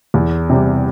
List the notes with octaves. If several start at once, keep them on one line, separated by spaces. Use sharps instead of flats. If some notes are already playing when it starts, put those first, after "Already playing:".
E2
C3 G3